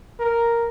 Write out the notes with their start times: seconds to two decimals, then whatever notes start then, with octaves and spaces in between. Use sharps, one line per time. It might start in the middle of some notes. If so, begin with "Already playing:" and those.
0.19 A#4